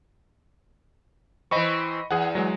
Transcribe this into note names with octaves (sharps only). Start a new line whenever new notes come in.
E3 C4 D#5 B5 C#6
E2 G#4 F#5
F#3 G#3